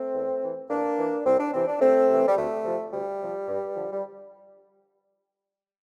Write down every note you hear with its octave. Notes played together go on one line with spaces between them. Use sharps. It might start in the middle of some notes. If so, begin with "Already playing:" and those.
Already playing: A3 C4
E2
E3
E2 A#3 D4
E3
C2 C4
D4
C3 E3 C4
D4
C2 A3 C4
C3 E3
G3
D2 A3
C3 F3
D2 G3
C3 F3
G2
D3 F3
G3